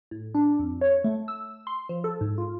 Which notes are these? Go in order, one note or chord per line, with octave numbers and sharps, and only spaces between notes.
A2
D4
F2
C#5
A3
E6
C6
F3
A4
G#2
F4